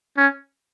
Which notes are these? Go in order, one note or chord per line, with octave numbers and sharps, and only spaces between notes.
C#4